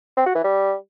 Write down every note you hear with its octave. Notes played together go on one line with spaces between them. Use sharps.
C4
F#4
E3
G3